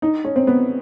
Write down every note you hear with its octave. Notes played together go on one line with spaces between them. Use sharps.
D#4
C#4
C4
B3